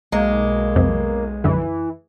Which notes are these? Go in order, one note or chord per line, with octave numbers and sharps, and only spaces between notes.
B1 G#3 A#3
F2 C3
F#2 D3 E3